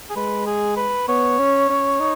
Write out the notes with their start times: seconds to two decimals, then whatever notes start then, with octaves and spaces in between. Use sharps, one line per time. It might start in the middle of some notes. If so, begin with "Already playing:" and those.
0.10 G#4
0.16 G#3 B4
0.46 G#4
0.77 B4
1.08 B3 C#5
1.39 C#4
1.70 C#4
2.00 D#4